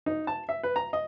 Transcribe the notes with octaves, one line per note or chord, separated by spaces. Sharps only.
D#4
A5
E5
B4
A#5
D#5